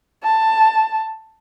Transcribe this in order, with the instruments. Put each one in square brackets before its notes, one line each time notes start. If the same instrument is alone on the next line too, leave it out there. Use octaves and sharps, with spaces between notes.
[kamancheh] A5